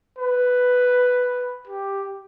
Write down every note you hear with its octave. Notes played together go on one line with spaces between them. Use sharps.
B4
G4